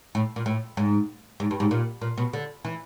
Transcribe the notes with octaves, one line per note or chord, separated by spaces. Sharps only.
A2
A#2
A2
G#2
G#2
G2
G#2
A#2
A#2
B2
D3
E3